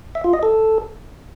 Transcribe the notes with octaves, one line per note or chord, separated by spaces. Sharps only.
E5
F4
D#5
A4